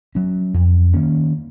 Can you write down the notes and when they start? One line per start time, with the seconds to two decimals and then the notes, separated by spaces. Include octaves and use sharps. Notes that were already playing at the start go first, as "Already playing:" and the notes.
0.15 F#3 C#4
0.54 F2
0.94 D#3 A#3 C#4